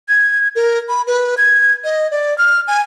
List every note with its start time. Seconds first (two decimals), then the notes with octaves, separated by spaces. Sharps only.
0.08 G#6
0.56 A#4
0.89 B5
1.07 B4
1.38 G#6
1.84 D#5
2.11 D5
2.38 F6
2.68 G#5